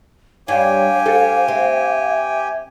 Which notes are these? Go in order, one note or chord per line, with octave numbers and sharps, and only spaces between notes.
G2 G4 C#5 F5 G#5
A4 C5
C4 E5